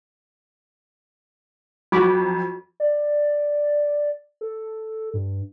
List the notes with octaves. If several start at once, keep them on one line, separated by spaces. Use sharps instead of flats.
F2 F#3 F#4 B5 D6
D5
A4
G2